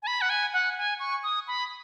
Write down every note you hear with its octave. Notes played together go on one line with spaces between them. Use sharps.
G#5
B5
F#5
G#5
F#5
G#5
C#6
D#6
B5